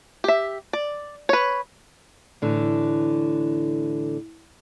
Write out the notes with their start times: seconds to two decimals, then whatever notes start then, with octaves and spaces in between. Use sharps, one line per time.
0.24 G4 E5
0.73 D5
1.29 B4 C#5
2.42 A2 D3 E3